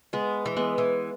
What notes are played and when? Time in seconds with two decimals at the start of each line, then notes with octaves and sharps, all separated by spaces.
0.13 G#3 B3
0.46 E3
0.56 G#3 B3
0.78 E3